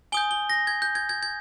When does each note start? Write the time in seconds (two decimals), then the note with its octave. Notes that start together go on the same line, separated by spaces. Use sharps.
0.12 G#5 D#6 G6 G7
0.31 G7
0.50 A#6
0.67 G#6
0.82 G6
0.95 G#6
1.09 G#6
1.23 G#6